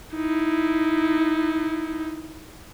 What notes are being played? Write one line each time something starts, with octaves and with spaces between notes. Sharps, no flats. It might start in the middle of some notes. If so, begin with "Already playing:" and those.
D#4 E4